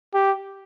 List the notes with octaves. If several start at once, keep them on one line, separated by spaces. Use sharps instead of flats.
G4